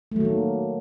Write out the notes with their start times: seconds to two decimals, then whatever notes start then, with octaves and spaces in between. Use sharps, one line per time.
0.12 A3
0.16 F#3
0.20 D#3
0.25 A#3